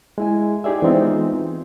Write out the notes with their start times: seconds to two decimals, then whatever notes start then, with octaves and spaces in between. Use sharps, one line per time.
0.18 G#3 E4 G#5
0.64 D#4 G4 G#4 D5 E5
0.82 E3 G#3 B3 C4 D#4 F4